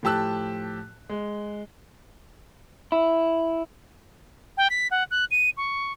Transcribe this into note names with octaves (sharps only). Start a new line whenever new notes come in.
A2 F3 G4 A5 E6 F#6
G#3
E4
G5
B6
F#5
F#6
D#7
C#6